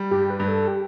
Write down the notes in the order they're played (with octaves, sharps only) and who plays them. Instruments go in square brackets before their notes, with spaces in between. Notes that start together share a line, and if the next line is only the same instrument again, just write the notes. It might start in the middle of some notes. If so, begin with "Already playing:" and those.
Already playing: [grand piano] G3
[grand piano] G2 [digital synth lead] G4
[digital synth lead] B4
[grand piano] G2
[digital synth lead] A4
G4